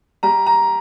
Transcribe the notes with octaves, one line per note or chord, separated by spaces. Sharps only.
G3 A#5
A#5